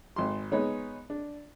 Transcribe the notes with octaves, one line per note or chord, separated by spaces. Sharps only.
G#1 C6
G#3 B3 D#4 C#5
D4